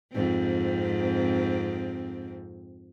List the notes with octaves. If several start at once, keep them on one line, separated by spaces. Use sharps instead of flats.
F2 G#2 C4